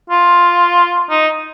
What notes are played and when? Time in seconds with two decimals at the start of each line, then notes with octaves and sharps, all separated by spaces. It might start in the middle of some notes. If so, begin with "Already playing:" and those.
0.10 F4
1.10 D#4